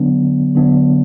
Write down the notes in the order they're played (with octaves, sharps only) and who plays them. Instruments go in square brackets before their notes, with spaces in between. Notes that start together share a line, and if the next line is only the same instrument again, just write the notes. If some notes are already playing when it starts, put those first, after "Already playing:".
Already playing: [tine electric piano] D3 F#3 B3 D4
D3 F#3 B3 D4